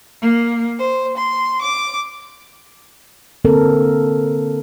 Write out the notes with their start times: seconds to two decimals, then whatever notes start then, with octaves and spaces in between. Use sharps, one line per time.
0.23 A#3
0.79 C5
1.16 C6
1.62 D6
3.45 D3 A#3 C4 A4 A#4